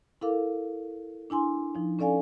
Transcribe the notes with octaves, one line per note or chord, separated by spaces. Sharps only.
E4 A4 A#4 F5 D6
D4 E4 G#5 C6
F3 D#4
C#4 A4 D5 F5 G#5